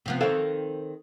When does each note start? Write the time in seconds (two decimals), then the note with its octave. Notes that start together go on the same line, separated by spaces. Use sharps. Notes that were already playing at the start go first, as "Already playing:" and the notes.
0.06 C3 F3 B3
0.21 D#3 C4 A4 C5 F5